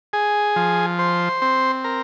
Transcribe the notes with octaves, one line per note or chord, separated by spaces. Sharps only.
G#4
F3
C5
C4
A#4